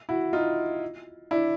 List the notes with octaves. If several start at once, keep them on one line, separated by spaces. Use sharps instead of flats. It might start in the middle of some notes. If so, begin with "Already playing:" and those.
E4 F#4
D#4 F4
D4 E4